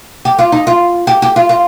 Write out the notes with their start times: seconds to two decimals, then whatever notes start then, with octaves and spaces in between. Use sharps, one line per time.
0.25 G4
0.39 F4
0.52 D#4
0.67 F4
1.07 G4
1.22 G4
1.36 F4
1.49 F4